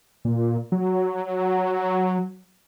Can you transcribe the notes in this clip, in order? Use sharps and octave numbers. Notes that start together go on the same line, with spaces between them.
A#2
F#3